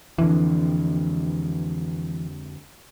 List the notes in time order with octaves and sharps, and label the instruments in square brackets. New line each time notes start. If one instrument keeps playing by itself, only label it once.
[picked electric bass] F2 D3 [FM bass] E3